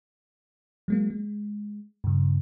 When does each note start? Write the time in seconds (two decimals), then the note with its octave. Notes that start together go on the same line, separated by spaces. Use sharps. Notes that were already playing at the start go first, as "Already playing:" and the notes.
0.88 F#3 G#3 A#3
1.10 G#3
2.04 G2 C#3